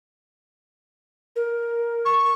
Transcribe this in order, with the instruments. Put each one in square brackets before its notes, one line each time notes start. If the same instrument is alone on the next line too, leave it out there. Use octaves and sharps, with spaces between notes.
[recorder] A#4
[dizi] C#6